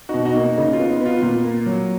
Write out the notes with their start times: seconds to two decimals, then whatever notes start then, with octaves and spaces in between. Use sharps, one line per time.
0.09 B2 D#4 F#4
0.25 D#4 F#4
0.36 A#3 D#4
0.58 C#3 D#4
0.73 F4
0.79 B3
0.90 D#4
1.01 B3 F4
1.22 A#2 F4
1.44 A#3
1.66 F#3